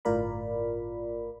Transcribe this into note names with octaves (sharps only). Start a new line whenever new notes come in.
G1 A2 F4 A#4 D5 B5